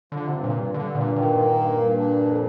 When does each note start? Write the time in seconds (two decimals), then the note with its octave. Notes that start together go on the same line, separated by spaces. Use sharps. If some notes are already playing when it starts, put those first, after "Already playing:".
0.12 D3 F3
0.27 C3
0.33 G2
0.44 A#2
0.54 G2
0.74 G2 D3
0.95 G2 A#2
1.16 A#2 D#3
1.36 A#3
1.57 G2
1.77 G2
1.99 D4
2.19 F2